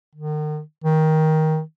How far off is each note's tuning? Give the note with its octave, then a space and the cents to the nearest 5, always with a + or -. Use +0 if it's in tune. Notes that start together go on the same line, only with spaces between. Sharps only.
D#3 -40
D#3 +15